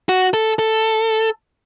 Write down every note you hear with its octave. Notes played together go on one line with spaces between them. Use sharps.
F#4
A4
A4